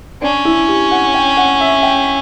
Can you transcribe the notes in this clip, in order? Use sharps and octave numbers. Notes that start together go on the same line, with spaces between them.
C#4 D4
E4
G4
F#5
G5
F#5
E5
G5